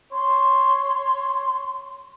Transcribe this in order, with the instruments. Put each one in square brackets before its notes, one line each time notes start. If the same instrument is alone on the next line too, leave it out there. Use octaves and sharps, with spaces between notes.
[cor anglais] C#5 [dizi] C6